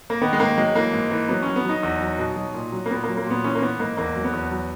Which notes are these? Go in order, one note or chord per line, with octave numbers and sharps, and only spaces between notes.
A#3
D#3 B3
G#3
G#2 A#3
F#3 G#3
E3 A#3
G#2
E3
F#3 B3
F#3 C#4
B3
F#3 D#4
E2
F#3
B2
F#3
A#2
F#3
A#3
A#2 B3
A#3
F#3
A#3
A#2 B3
E3 C#4
A#3
E3 B3
G#2 A#3
E2 A#3
F#3
B3
E2
F#3